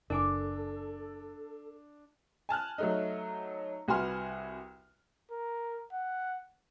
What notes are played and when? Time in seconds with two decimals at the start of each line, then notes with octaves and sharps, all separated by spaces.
0.10 F#1 D4 A4 A#4 G#5 D6
2.49 G#5 A5 F6 F#6
2.78 F#3 A3 D#4
3.88 C2 F#4 B4 G#5 C6 F6
5.31 A#4
5.93 F#5